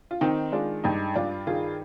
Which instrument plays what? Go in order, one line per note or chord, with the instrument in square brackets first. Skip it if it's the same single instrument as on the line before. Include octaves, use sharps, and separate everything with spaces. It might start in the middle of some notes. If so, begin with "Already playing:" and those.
[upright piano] F4
[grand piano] D#3 [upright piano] C4 D#4
[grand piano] G#3 [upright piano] D4 F4
[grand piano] G2 [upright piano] D#4 G4
[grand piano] G2 [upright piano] D4 F4
[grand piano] D#3 [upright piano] F4 G#4